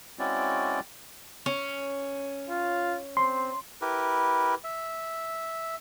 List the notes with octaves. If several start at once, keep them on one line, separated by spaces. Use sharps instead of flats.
G#3 C4 C#4 E4 F#4 D5
C#4
F4
C4 C6
E4 G4 A#4 B4
E5